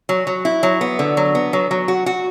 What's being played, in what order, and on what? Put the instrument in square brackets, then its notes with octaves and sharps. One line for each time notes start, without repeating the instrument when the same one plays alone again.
[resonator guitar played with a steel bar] F#3
F#3
E4
F#3
B3
D3
F#3
B3
F#3
F#3
F#4
F#4